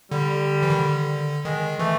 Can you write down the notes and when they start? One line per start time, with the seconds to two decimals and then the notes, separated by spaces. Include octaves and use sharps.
0.11 D3 G3
0.62 E3
0.70 D#3
0.79 D3
1.45 D#3 G#3
1.79 E3 A3